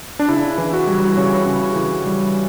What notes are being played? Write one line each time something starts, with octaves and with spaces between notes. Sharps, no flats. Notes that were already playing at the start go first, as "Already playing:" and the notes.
D4
C#3 E4
E3
F#4
G3
C#3 C#5
C#3
E3
G3